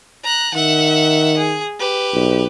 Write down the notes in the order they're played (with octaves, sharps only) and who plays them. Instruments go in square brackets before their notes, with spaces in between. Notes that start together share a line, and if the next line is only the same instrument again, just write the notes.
[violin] A#5 F#6
[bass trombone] D#3 [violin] E5 F#5
[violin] G#4
G4 B4
[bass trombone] B1